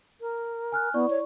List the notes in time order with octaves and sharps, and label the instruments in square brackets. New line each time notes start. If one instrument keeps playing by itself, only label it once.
[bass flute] A#4
[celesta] G#5 F6 F#6
[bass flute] B3 [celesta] E4 D5 C#6
[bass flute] C#5